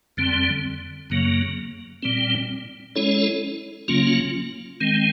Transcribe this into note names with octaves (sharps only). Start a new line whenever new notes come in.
F2 D3 G3 C4
F#2 C#3 F#3 A#3
A#2 G3 C4
G#3 C#4 E4 A4 C#5
C#3 F#3 A#3 C#4 F4
D#3 G#3 C4